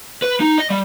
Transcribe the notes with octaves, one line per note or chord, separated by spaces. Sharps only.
B4
D#4
D#5
G3